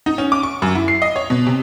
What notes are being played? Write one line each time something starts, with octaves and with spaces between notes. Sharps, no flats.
D#4
C#4
D6
C#6
F#2
E4
C7
D#5
C#5
B2
C3